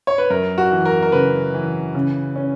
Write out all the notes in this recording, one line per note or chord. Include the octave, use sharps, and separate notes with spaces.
C#5
B4
F#2 A#4
F#4
E3
A#4
A#4
C#3 B4
E3
C#3
C#4